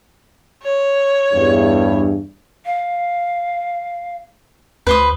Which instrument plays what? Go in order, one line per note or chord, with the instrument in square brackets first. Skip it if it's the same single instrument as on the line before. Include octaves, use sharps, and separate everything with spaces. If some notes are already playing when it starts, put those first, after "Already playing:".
[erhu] C#5
[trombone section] E2 G2
[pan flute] F5
[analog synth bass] D2 [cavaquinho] B4 C5 D#6